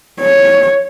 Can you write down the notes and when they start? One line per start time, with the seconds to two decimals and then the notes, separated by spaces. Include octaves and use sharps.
0.20 C#5